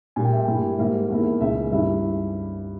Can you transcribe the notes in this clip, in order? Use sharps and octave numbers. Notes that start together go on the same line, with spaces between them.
A#2 G3 A#3 G#5
G5
E5
G5
G2 G3 A#3 E4
G#2 D#3 G3 A#3 E5
E2 D#3 A#3 E4
C#2 C#3 G#3 D#4 E5
G2 D#3 G3 C#4 E4 E5